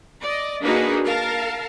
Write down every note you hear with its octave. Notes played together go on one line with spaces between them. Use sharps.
D5 D#5
A#3 D4 D#4 F#4 G#4 B4
A#4 F5 A5